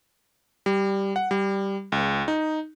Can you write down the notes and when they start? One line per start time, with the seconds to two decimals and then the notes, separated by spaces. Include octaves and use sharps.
0.66 G3
1.16 F#5
1.31 G3
1.92 C#2
2.28 D#4